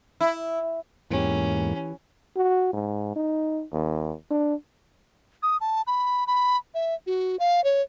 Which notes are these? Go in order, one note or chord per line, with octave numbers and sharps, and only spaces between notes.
E4
E2 G#2 E3 A#3 C#4 G4
F#4
G#2
D#4
D#2
D4
D#6
A5
B5
B5
E5
F#4
F5
C#5